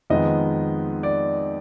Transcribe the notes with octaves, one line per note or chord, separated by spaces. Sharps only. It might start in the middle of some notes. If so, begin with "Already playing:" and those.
F2 D#3 G#3 B3 D#5
D5